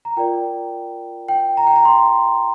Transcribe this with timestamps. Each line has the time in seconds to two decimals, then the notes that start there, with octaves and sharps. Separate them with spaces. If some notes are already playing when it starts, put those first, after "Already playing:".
0.05 A#5
0.17 F4 A#4 D5 G5
1.29 G5
1.57 A#5
1.67 G5
1.76 A#5
1.85 C6